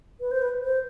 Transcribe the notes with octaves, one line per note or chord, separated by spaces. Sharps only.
B4
C5
B4
C5